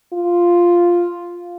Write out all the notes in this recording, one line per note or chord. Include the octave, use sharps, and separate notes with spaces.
F4